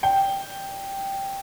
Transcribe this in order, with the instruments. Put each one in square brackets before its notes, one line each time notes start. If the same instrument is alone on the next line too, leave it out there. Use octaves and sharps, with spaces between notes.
[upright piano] G5